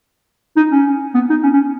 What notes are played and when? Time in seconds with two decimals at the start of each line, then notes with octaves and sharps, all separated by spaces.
0.57 D#4
0.72 C#4
1.15 B3
1.30 D#4
1.43 C#4
1.53 C#4